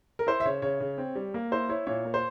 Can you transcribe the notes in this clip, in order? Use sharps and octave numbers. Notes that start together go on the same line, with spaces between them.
A#4
E4 C5
E5
C#3 C#5
C#3 C#5
C#3
C4
G3
A#3
E4 C5
E4 C#5
A#2 C#5
A#3
C5